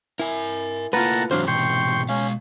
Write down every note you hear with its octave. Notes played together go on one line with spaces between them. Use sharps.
E4 A#4 G#5
A3 A#3 E4 F4 B4 F#5 A5 A#5
G#2 C3 E3 F#3 D4 C5 F5
B2 G5 C6 C#6
G#3 C#4 F5